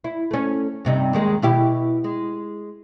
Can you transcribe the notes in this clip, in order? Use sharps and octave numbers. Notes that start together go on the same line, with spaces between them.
E4
A3 C#4
G2 C3 D#4
D#2 D#3 G#3
B2 E4 G4
G#3